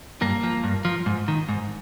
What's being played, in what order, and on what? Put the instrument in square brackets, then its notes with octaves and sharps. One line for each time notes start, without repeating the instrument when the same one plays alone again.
[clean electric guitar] G2 A#3
F3
G2
F3
G#2
D#3
G#2